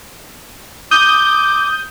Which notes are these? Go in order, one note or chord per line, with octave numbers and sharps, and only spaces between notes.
D6 D#6 G6